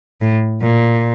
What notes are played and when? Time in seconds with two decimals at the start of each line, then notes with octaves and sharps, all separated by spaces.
0.21 A2
0.62 A#2